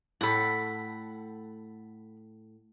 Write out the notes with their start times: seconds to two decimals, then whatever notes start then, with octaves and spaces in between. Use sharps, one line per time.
0.21 A2 A4 F#5 B5